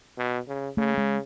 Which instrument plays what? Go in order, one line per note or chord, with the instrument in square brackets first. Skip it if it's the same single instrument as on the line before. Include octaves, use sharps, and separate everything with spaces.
[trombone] B2
C#3
[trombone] C#3 [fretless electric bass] A3
[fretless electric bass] G#3